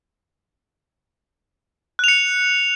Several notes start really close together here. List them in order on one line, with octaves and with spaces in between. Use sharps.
F#6 F7 C#7